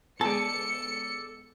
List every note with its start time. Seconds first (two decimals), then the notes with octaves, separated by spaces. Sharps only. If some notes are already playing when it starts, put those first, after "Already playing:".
0.21 G#3 B3 A4 D5 A5 C#7